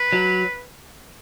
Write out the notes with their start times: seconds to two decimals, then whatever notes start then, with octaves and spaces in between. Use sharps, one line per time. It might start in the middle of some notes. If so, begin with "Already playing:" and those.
Already playing: B4
0.12 F#3